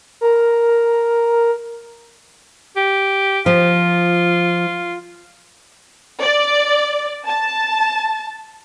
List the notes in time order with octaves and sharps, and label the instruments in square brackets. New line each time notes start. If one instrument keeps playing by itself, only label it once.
[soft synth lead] A#4
[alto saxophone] G4
[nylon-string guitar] F3 [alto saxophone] F4
[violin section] D5
A5